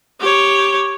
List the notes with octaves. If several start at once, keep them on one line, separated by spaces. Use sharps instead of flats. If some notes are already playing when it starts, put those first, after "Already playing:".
G4 C#5